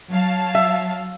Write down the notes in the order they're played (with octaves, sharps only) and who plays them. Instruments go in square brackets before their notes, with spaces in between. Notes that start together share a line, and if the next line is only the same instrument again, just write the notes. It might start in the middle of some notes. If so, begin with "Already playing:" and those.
[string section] F#3 F5 A5
[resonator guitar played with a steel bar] E5